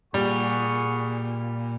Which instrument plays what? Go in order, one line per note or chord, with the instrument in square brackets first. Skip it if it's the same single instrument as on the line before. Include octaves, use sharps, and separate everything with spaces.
[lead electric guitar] A#2 [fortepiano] G3 [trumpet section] G#4 F#5 C#6